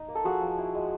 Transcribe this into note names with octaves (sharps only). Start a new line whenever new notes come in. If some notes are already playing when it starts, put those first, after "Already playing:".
Already playing: D#4
A#3
A4
F3 F#4 G#4
F3
E4
G#3